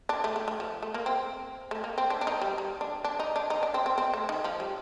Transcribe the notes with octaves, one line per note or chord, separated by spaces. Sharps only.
D4
A3
A3
A3
F3
A3
A#3
C4
A3
A#3
C4
D4
D4
D#4
G3
G3
D4
D4
D#4
D4
D#4
D4
C4
C4
C4
A3
D#3
F3
G3